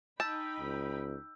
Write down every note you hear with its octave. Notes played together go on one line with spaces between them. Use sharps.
D#4 G5 A5 B5 E6 G6
C#2